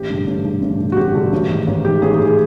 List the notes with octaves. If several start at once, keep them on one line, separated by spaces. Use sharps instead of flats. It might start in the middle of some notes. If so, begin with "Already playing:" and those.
Already playing: A1 G4
G2 D3
A1
G2 D3
A1
G2 D3
F#4
A1 G4
G2 D3
A1
G#2 D#3
A1
G#2 D#3 G4
A1 G#4
G#4
G#2 D#3
G#4